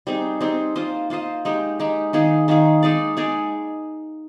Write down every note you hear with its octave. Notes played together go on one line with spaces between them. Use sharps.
G3 C4 D#4 G#4
G3 C4 D#4 G#4
A#3 F4 C5 D#5
A#3 F4 C5 D#5
G#3 D#4 G4
G#3 D#4 G4
D#3 A#3 D#4 G#4
D#3 A#3 D#4 G#4
G#3 D#4 G#4 D5
G#3 D#4 G#4 D5